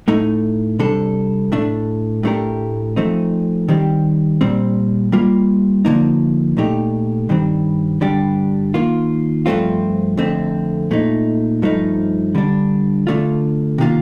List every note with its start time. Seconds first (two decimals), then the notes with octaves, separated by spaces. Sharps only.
0.08 A2 A3 D#4
0.79 C3 G3 D4 A4
1.52 A2 A3 D4
2.23 A2 A3 D4 G4 A#4
2.96 F3 A3 C4 D#4
3.68 D#3 G3 C4 G4
4.41 A#2 G3 C4
5.12 G3 A#3 F4
5.85 D3 F3 A#3 D#4
6.57 A#2 A3 D#4 G4
7.29 G2 D#3 G3 C4
8.01 G2 D3 G3 D4 G4
8.74 D#3 A#3 F4
9.46 G2 F3 A3 C4 F4
10.17 F2 D3 A3 C4
10.91 A#2 A3 D#4
11.62 G2 F3 A3 D#4
12.35 D3 G3 D4
13.07 D3 A3 D4 F4
13.78 C3 D#3 A#3 F4